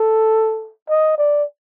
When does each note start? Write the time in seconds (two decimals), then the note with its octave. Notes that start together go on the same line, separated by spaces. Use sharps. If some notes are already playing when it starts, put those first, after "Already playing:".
Already playing: A4
0.89 D#5
1.18 D5